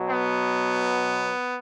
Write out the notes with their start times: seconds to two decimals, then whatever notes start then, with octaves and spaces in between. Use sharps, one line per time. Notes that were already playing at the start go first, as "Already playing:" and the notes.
Already playing: B2 F#3
0.10 B3